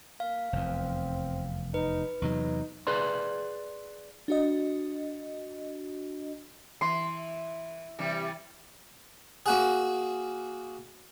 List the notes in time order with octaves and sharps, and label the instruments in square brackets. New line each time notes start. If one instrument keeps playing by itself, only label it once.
[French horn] A#3 [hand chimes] F5
[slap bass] F1 E2 [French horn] C4
[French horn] D#4 [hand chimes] B4
[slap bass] E2 C3 F#3 [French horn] D#4
[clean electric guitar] G#4 B4 D5 C6
[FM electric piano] D4 F#4 D#5
[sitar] E3 [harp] C6
[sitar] C3 E3 G3
[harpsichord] A#3 F#4 G#4